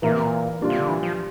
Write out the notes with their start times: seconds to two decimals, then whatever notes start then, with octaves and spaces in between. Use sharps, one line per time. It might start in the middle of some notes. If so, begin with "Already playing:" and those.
0.02 A#2 E3 A#3 E4 A#4
0.12 C3
0.22 A#2
0.60 A#2 G3 D4 F4
0.70 C3
0.79 D3
0.88 E3
1.03 F3